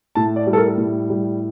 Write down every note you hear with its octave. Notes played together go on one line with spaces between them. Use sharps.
A2 A5
D5
G3
A4
A#4
A2
G3